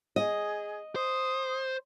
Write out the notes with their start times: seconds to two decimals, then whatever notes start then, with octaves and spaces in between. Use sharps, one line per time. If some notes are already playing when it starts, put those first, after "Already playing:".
0.16 G#4 D#5
0.96 C5 D#6